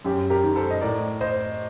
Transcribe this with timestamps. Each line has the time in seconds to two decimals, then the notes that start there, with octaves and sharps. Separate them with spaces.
0.05 F#2 G4
0.30 G4 A#4
0.44 D#3
0.56 A4 C5
0.70 D#5
0.81 A2 A#4 D5
1.21 C5 D#5